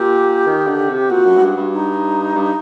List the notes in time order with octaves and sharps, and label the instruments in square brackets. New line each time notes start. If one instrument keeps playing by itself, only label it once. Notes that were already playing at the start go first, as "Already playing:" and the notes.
Already playing: [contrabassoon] A#2 [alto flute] G4
[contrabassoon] D#3
D3
C3
[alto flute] G4
[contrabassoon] A#2 [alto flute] F#4
[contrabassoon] F#2
A2
G2
G2
[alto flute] D#4
[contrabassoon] G2